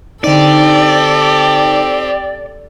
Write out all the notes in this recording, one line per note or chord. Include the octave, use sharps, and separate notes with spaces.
D3 C4 D#4 G4 A4 D5